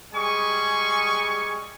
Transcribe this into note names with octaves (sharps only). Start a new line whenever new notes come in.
G3 G#3 G#4 G#5 C#6